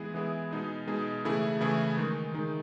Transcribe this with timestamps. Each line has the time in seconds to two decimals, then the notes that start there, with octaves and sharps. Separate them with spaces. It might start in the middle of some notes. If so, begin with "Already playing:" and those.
Already playing: E3 G#3 B3 E4 G#4
0.14 E3 G#3 B3 E4 G#4
0.51 B2 G#3 D#4 G#4
0.87 B2 G#3 D#4 G#4
1.24 C#3 E3 A3 E4 G#4
1.61 C#3 E3 A3 E4 G#4
1.97 D#3 G#3 D#4
2.34 D#3 G#3 D#4